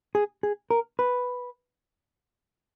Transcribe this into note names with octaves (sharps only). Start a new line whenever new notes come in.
G#4
G#4
A#4
B4